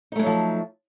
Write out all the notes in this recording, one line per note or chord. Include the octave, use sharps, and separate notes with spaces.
F3 F#3 G#3 A3 D#4